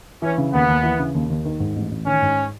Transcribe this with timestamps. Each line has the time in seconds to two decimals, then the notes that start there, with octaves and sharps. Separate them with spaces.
0.22 E3 C#4
0.38 C#3
0.53 D#2 B3
0.68 D#2
0.83 E3
0.99 C#3
1.15 D#2
1.30 D#2
1.45 D#3
1.60 G#2
1.76 A1
1.92 A1
2.06 D#3 C#4
2.22 G#2